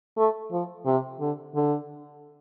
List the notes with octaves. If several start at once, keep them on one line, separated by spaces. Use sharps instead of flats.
A3
F3
C3
D3
D3